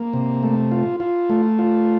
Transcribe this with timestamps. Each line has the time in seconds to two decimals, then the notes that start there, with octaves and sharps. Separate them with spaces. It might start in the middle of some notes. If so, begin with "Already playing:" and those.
Already playing: A#3
0.13 C3
0.43 A3
0.71 F4
1.00 F4
1.30 A3
1.59 F4